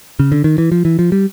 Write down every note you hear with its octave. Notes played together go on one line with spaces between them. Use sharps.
C#3
D3
D#3
E3
F3
E3
F3
G3